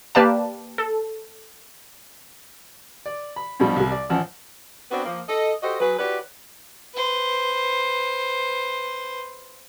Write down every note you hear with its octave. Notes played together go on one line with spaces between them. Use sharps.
A#3 G4 B4 D5 F5 A5
A4
D5
B5
G2 B2 F3 G3
C2 G3
D5
A1 F#2 F3 F#5 G#5 E6
B3 C4 D4 F#4 B4 C#5
F3 A#3
A4 D#5
F#4 G4 A4 C5 D#5
F#3 G#4 B4
E4 F#4 G4 B4 C#5 D5
B4 C5